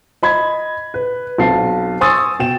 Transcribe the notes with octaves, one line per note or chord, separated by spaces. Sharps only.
D#5 B5 G#6
B4
B1 C4 F5 A5 C7
G#5 C6 C#6 D#6 E6 A6
B2 G5 E7